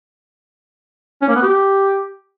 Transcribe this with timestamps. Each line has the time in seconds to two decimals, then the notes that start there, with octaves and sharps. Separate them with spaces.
1.22 C#4
1.29 A#3
1.36 B3
1.43 G4